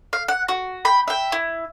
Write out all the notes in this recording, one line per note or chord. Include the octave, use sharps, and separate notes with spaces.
F5
F#5
F#4
G5 B5
E5 G5
E4